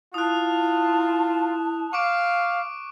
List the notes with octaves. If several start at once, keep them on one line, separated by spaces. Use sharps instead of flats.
E4 F4 A5 D#6 F#6
F5 C#6 D6 D7